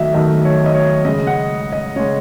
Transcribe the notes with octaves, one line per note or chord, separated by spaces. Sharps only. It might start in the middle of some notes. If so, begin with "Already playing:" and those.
Already playing: D#3 F#3 A3 F#4 D#5 E5
D#3 F#3 A3 D#5
C#5
D#5
C#5
C#3 G#3 D#5
F#5
D#5
C#3 G#3 C#5